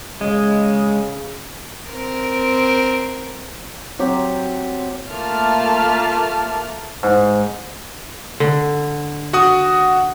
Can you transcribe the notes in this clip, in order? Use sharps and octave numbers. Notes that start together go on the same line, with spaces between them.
C#3 G#3
C4 A#4
F#3 C4 G4
A3 A#3 F4 A5 F6
G#2
D3
F#4 F#5 D#6